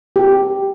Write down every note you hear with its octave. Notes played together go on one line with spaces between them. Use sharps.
G4